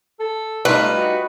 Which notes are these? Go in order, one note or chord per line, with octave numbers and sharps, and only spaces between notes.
A4
G3 A3 D#4 F4 B4
F#4